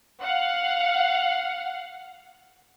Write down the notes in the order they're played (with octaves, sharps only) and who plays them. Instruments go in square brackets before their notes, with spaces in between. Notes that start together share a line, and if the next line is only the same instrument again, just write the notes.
[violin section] F5 F#5